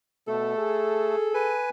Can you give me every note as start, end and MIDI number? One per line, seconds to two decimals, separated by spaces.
0.28 0.56 47
0.28 1.15 57
0.28 1.65 69
0.58 1.56 68
1.34 1.70 71
1.34 1.70 80